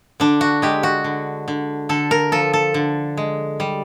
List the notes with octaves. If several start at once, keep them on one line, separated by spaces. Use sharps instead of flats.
D3 D4
F#4
G#3 G4
F#4
D3
D3
D3 A4
A#4
F3 A4
A4
D3
G#3
G3